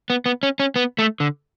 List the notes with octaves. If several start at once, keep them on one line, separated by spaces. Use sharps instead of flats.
B3
B3
C#4
C#4
B3
A3
D3